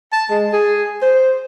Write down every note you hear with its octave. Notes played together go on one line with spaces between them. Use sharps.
A5
G#3
G#4
C5